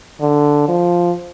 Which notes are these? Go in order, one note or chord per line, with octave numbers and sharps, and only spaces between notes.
D3
F3